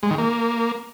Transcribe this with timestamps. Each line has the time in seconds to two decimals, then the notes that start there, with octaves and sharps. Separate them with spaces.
0.03 G#3
0.11 D#3
0.18 A#3